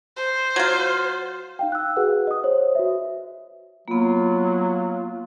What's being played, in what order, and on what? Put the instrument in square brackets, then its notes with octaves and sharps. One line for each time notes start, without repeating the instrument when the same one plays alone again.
[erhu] C5
[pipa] F#3 F4
[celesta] D#4 F5 G5
E6 F#6
F#4 G#4 B4 F#5
D#5 D#6
C5 C#5 D#5
F#4 B4 E5
[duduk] F#3 [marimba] A#3 B3 [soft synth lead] F4